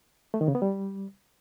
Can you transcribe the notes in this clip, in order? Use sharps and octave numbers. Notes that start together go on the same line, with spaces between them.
A3
D#3
C#3
B3
G3